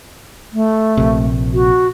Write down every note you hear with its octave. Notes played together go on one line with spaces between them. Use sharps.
A3
A#1 C3
F#4